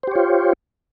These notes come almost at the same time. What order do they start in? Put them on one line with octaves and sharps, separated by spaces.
C5 G4 C#5 F4